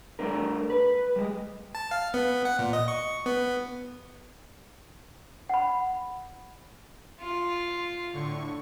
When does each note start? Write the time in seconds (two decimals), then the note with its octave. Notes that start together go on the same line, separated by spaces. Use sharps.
0.19 G3 A3 D4 A#4
0.70 B4
1.16 G3 G#3
1.75 A5
1.91 F5
2.14 B3
2.45 F#5
2.59 A#2
2.73 D#5
2.88 C#6
3.26 B3
5.49 F#5 B5
7.20 F4
8.13 A2 D3 C#6